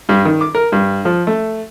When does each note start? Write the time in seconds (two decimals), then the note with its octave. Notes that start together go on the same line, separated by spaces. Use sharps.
0.09 G2
0.25 D#3
0.41 D6
0.55 A#4
0.72 G2
1.05 F3
1.27 A3